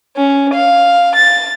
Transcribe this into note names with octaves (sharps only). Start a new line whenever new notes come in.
C#4
F5
A6